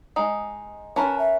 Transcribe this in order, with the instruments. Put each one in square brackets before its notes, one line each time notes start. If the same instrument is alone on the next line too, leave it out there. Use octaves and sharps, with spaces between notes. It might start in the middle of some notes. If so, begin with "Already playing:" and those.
[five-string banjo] G#3 D#4
[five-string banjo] C#4 A#4 B4 [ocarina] A5
[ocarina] E5